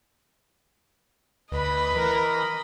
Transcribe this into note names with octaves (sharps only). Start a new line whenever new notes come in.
D2 B4 D#5 B5
E3 A#4